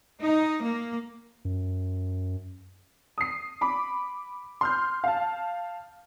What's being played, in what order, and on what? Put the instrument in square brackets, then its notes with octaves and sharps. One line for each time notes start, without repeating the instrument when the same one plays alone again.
[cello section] D#4
A#3
[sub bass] F#2
[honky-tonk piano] D#6 C7
B5 D6
C6 F6 G6
F5 A5